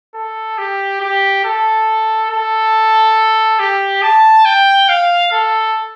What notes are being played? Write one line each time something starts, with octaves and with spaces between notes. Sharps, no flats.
A4
G4
G4
A4
A4
G4
A5
G5
F5
A4